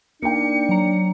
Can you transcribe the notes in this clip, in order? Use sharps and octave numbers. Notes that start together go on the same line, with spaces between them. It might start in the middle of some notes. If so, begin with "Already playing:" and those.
A#3 D4 D#4 G5 C#7
F#3 A#5